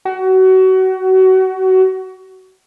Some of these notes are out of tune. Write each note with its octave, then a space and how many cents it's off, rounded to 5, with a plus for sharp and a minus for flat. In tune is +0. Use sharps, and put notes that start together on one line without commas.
F#4 +25